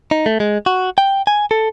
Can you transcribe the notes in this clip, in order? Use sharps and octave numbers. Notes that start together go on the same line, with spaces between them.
D#4
A3
G#3
F#4
G5
G#5
A4